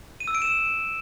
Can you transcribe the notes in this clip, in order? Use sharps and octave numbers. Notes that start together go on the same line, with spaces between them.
D#7
E6
D7
E7